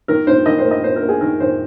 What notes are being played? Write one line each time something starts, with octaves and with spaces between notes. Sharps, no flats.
D#3 A#4
D#4 C5
D#3 D#5
C5
A#3
D#5
A#3 C5
A#4
A#3
G#4
D#3 A#4
D#3 C5